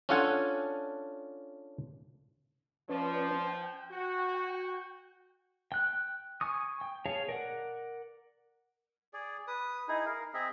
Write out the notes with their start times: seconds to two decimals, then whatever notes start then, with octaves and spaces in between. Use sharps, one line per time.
0.09 C#4 D4 F4 A4 F#5 G#5
2.89 F3 C#4 B4 D5
3.44 G5
3.91 F#4
5.72 G5 F#6
6.41 G#5 C#6 D#6
6.81 G5
7.06 G#4 C#5 F5 G#5 A5
7.29 A#4 D5 F#5
9.13 G#4 D5
9.47 B4 D#6
9.88 D#4 E4 G#4
10.06 A#4 F5
10.34 C4 G#4 D#5 E5